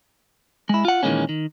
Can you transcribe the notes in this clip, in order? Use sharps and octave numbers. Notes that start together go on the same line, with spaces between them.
G#3 E4
F4 F#5
A#2 D#3 E3 G#3 A#3 C#4
D#3